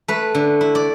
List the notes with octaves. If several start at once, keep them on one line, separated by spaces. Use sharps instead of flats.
A3 B4
D3
E4
D5